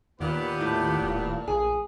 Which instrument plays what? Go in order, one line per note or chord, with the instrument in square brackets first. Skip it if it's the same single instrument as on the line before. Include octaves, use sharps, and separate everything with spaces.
[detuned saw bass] D#2 [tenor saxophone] A#2 [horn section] B3 G4 B4
[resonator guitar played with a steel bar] A2
[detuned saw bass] D#1
[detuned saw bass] A#1 [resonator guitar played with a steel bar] G#4